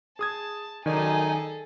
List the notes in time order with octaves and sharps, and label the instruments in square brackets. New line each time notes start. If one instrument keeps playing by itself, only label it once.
[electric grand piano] G#4 D#6 G#6 [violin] A5
[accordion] F#2 D#4 G#5 [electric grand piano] D#3 D5 [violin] G#4 A4